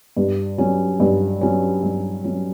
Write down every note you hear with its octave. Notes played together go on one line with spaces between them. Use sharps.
G2
F#3 C#4
G2
F#3 C#4
G2
F#3 C#4